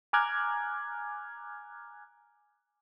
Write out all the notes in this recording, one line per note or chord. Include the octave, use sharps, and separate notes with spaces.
G#5 A#5 D6 F6 F#6 G#6